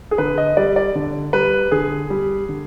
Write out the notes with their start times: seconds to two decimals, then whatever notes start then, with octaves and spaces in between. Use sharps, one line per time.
0.11 G#4
0.18 D3 B4
0.38 D#5
0.57 G3 D5
0.76 D5
0.95 D3
1.33 G3 B4
1.72 D3 G#4
2.10 G3
2.49 D3